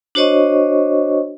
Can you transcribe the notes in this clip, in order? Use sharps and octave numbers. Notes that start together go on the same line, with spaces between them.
D4 F#4 C5 C#5 D#5 C#6